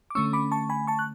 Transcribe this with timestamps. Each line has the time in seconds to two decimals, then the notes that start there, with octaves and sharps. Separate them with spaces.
0.10 D6
0.15 D3 A3 C#4 C#6 E6
0.33 B5 D6
0.52 A5 C#6
0.70 G#5 B5
0.87 A5 C#6
0.99 F#6